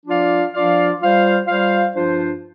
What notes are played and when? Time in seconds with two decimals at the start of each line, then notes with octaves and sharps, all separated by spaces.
0.05 F3 D4 F4 D5 F5
0.52 F3 D4 F4 D5 F5
0.99 G3 F4 C5 F5
1.46 G3 F4 C5 F5
1.93 G2 F3 D4 F4 C5